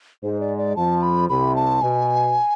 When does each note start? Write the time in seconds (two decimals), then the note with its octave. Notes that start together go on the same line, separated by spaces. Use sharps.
0.23 G#2 G#3 C5
0.40 D5
0.58 D5
0.76 F2 F3 A5
1.03 B5
1.29 C2 C3 B5
1.56 A5
1.82 B2 G#5